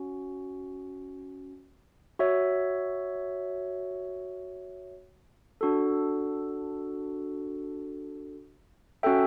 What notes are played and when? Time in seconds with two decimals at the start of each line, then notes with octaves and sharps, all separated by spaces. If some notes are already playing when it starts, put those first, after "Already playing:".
Already playing: C#4 F#4
2.19 F#4 C#5 E5
5.61 D4 F#4 A4
9.03 C#4 F#4 A4 E5 G5